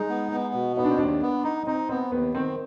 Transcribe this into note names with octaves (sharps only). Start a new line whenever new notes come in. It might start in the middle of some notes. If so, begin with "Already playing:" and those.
Already playing: G#3 D#4
B3
B3
B2
B3 D#4
D4
C4
D#2 D4
B3
D#4
C4 D#4
B3 C4
D#2 B3
D#3 C4